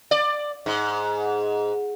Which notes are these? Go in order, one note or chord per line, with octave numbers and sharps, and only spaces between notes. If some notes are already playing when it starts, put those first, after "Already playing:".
D5
G#2